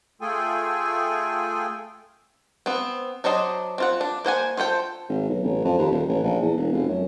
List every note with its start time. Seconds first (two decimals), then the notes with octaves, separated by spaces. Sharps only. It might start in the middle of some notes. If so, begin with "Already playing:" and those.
0.21 A3 F4 G#4 A4 G5 G#5
2.66 B3 C4
3.24 F#3 D4 C5 D#5
3.78 C4 F4 F#5
4.01 D4
4.25 A#3 C5 F#5 G#5
4.57 F4 A4 C5 G5
5.09 G#1
5.29 B1
5.44 A1
5.64 F2
5.78 D#2
5.91 D#1
6.09 A1
6.23 A#1
6.42 E2
6.57 E1
6.72 F1
6.88 F#2